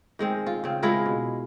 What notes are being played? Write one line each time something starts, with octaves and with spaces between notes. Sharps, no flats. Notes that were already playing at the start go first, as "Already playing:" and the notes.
D#3 G#3 C4
F4
C#3 C4
G#3 E4 F4 A#4
B2